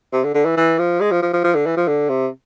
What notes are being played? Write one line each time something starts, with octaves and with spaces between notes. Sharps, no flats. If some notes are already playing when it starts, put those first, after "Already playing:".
C3
D3
D3
E3
E3
F3
G#3
F3
F3
F3
F3
D3
E3
F3
D3
C3